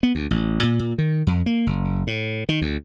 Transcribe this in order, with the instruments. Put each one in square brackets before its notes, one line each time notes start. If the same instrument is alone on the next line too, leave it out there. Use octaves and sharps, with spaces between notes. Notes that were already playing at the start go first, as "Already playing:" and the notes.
[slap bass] B3
D2
A1
A#2
A#2
D#3
F2
A#3
F#1
A2
D#3
D2